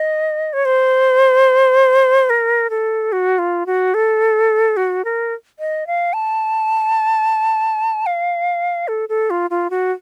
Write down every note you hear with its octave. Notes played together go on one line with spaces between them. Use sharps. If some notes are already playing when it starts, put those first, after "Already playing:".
Already playing: D#5
C#5
C5
A#4
A4
F#4
F4
F#4
A4
F#4
A#4
D#5
F5
A5
F5
A4
A4
F4
F4
F#4